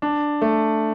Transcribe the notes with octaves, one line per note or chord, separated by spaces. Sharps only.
D4
A3